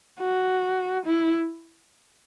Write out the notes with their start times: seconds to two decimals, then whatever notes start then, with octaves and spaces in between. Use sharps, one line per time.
0.20 F#4
1.06 E4